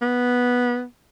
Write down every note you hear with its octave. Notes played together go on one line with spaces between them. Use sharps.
B3